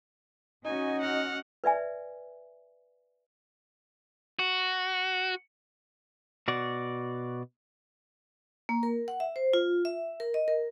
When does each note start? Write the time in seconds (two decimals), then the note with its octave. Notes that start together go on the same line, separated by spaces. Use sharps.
0.65 C#4 D#4 F#4 D#5 G#5
1.01 F#5 F6
1.64 B4 D5 E5 G#5
4.39 F#4
6.48 B2 F#4 D5
8.69 A#3
8.83 A#4
9.08 F#5
9.20 E5
9.36 C5
9.53 F4
9.85 E5
10.20 A#4
10.34 D#5
10.48 A#4